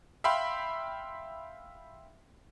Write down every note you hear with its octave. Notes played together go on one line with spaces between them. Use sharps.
E5 F5 G5 B5 C6